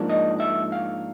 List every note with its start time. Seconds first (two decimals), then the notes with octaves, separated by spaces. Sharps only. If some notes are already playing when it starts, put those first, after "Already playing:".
Already playing: G#2 F3 A#3 D4
0.09 D#5
0.40 E5
0.72 F5